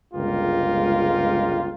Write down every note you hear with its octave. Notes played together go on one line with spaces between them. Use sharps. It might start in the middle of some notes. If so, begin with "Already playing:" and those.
G1 C#2 G#3 F4 G4 A#4